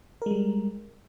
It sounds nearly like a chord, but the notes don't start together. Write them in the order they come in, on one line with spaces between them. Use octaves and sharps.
A#4 G#3 G3